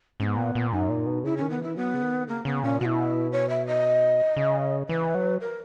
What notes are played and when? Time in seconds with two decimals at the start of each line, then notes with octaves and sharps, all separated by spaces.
0.20 G#2 C#4
0.24 B3
0.37 A#2
0.55 A#2
0.72 F#2 D#4
0.89 A#2
1.06 B2
1.24 C#3 E4
1.37 D#3 C#4
1.50 B3
1.59 E3 E4
1.76 F#3 B3
1.94 C#3
2.02 D#3
2.28 C#3 A#3
2.45 C#3 B3
2.63 A#2 C#4
2.80 B2 E4 F#4
3.32 C#5
3.49 E5
3.67 D#5
4.37 C#3
4.89 E3 B4
5.15 F#3
5.41 A#4